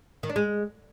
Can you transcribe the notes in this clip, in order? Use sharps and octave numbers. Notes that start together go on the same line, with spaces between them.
D#3
D4
G#3